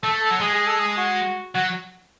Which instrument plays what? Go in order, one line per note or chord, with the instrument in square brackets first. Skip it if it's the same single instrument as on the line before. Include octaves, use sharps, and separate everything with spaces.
[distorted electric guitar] A3 [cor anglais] A4
[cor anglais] A4
[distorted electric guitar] F#3
[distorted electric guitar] G#3 [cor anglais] G#4
[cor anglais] G#4
A4
G#4
F#4
[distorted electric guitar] F#3 [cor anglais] F#4